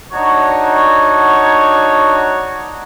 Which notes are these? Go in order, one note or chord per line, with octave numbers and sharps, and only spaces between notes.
D4 D#4 F#4 C#5